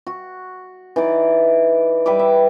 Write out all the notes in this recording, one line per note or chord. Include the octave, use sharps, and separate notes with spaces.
F#4
E3 D#4 D5
G3 B4 E5 D6
E5